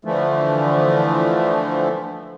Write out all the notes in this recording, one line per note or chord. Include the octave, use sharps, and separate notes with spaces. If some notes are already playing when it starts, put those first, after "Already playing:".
D3 E3 F3 A3